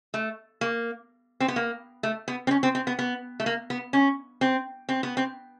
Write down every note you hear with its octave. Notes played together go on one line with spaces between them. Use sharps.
A3
A#3
C4
B3
A#3
A3
B3
C4
C#4
C4
C4
B3
B3
A3
A#3
B3
C#4
C4
C4
B3
C4